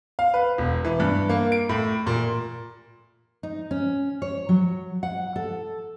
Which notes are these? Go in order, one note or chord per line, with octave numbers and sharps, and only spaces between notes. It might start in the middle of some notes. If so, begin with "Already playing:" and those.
F5
B4
E1
E3
G2
A#3
D7
A2
A#2
D#4
C#4
C#5
F#3
F#5
A4